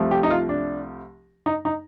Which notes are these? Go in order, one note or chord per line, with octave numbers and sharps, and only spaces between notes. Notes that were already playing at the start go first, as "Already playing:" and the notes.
Already playing: C2 C3 F3 A3
G4
D#4
F4
D4
D#4
D#4